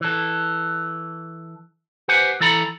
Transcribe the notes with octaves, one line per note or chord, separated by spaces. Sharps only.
E3 A4
G4 B4 C5 F#5 G#5
E3 E4 A4 A#5 B5